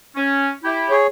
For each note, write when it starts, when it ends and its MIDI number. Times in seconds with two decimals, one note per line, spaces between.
0.16 0.50 61
0.64 0.95 64
0.64 0.95 67
0.90 1.07 68
0.90 1.07 73